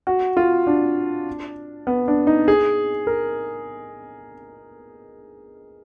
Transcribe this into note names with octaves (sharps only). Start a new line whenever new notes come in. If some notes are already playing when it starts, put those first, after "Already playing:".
F#4
F4
D4
B3
D4
D#4
G#4
A#4